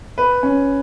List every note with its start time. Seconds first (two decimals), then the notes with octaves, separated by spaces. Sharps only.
0.18 B4
0.43 C#4